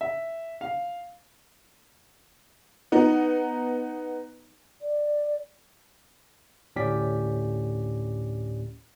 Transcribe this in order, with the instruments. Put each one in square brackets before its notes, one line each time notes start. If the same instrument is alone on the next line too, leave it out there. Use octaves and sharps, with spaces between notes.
[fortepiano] E5
F5
[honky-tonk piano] B3 D#4
[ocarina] D5
[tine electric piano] D2 A2 C#4 G4 D5 B6